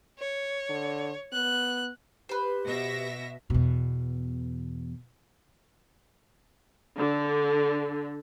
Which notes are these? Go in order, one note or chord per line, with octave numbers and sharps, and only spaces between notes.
C#5
D3
B3 F#6
G4 B4 C5
B2 E5 A#6
E2 B2
D3